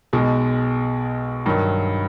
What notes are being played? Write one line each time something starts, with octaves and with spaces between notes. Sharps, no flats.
B1 B2 G#3
G2 D#3 F#3